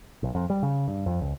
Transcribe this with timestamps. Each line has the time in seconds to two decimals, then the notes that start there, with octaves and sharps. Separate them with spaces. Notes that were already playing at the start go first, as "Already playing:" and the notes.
0.23 B1
0.35 F2
0.50 G3
0.63 C#3
0.88 G2
1.06 F2
1.21 C#2